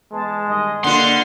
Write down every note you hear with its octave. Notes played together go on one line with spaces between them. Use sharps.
E2 G#3 B3 A5
G2 D#3 D#5
D3 A#3 F4 B4 F#5 C6